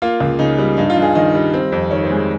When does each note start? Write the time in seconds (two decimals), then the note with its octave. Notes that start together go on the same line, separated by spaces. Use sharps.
0.02 A#3 F4
0.20 C#2
0.39 C#3 D#4
0.58 G3
0.77 G2 D#4
0.90 F4
0.97 G2
1.02 G#4
1.15 D#3 D#5
1.35 G3
1.54 C4
1.72 F2
1.91 D#3 C#5
2.04 C5
2.10 G#3
2.16 G#4